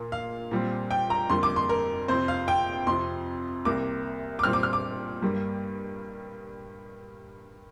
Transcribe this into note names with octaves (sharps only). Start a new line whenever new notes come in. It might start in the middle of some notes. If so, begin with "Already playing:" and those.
Already playing: A#2 A#3
F5
A#2 G3 C4
G5
A#5
F2 D3 G3 A#3 C6
D6
C6
A#4
F2 C3 F3 C4 C5
F5
G5
F2 C3 F3 C6
C2 C3 A#3 D6
D6
A#2 G3 C4 F6
D6
F6
D6
G2 G3 A#3